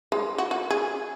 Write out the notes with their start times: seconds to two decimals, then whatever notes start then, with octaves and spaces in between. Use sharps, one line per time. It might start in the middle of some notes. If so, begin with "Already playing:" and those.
0.12 G#3
0.38 F#4
0.51 F#4
0.70 G#4